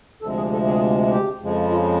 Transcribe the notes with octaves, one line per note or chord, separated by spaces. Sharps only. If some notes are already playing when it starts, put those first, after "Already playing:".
D2 C3 F3 G#3 A4
G#4
A4
G#4
G4
F2 C#3 F3 G#3
F4